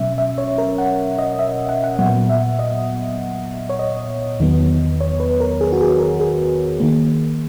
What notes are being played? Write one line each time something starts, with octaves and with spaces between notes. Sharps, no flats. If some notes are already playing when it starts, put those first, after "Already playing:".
Already playing: B2 F#3 C#4 E5
E5
C#5
A#4
F#5
D#5
E5
F#5
F#5
A#2 F#3 B3 F#5
E5
D#5
C#5
D#5
E2 D#3 F#3 B3
C#5
B4
A#4
G#4
F#4
G#4
A#4
G#4
D#3 A#3